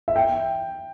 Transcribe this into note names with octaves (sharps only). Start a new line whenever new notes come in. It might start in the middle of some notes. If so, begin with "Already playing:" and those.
E5
G5